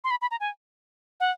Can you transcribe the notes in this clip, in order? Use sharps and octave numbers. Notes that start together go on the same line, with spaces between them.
C6
B5
B5
A#5
G#5
F#5